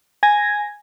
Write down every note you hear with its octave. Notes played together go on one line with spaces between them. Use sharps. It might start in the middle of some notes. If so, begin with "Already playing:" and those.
G#5 G#6 A#6